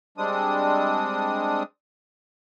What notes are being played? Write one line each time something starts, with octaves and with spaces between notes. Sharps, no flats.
G3 G#3 C4 D4 D#6